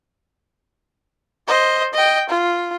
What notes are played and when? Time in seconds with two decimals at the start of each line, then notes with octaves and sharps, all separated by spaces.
1.48 C5 D#5
1.94 D#5 G5
2.29 F4